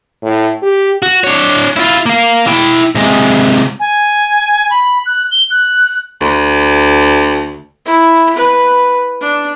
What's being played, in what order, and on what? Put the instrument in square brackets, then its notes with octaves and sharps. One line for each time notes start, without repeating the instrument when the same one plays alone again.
[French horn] A2
G4
[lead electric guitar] F#4
D4 C#5
E4 F4
A#3 F5
E4 G5
C3 G#3
[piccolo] G#5
B5
F#6
G7
F#6
[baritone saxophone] D2
[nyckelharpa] E4
B4
D4